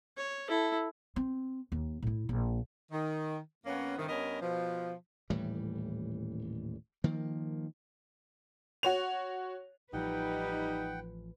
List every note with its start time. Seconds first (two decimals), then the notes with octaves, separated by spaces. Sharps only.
0.17 C#5
0.49 E4 A4
1.16 C4
1.72 D#2
2.02 A2 E4
2.29 A#1
2.92 D#3
3.66 F2 A#3 B3 C#4
3.97 G2 C3 D#3
4.09 G2 B3 C#4 A#4 D#5
4.42 B2 F3
5.30 D#1 A2 E3 G3
7.04 D#3 F3 A#3
8.83 F#4 C#5 F7
9.93 A1 F3 G3 D#4 B4 F#5 G5